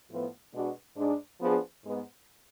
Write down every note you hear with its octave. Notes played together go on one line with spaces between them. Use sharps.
A2 F3 B3
B2 G#3 D4 F#4 B4
G#2 G#3 D4
F3 B3 D4 G#4
G#2 G#3 B3